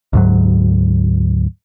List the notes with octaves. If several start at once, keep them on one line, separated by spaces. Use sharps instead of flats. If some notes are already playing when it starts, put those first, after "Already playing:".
D2 G#2 F#3